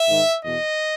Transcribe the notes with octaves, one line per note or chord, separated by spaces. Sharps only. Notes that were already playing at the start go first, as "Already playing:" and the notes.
Already playing: E5
G#2 D#3
E2 B2 D#5